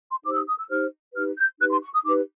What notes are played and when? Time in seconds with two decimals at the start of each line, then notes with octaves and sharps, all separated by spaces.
0.10 C6
0.24 D#4 G4 C5 D6
0.32 E6
0.35 D#6
0.47 D#6
0.58 E6
0.69 D#4 G4 C5 F6
1.14 D#4 G4 B4 F6
1.37 G6
1.59 D#4 G4 B4 F#6
1.71 C6
1.82 C#6
1.93 D#6
2.04 D#4 G4 B4 D6